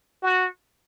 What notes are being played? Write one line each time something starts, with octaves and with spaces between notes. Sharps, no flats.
F#4